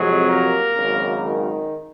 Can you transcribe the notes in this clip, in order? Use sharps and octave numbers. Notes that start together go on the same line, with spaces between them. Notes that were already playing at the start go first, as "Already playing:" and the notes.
Already playing: F2 C3 F#3 G#3 G#4
A#3 A#4
G#1 F#2 C#3
D#3 D#4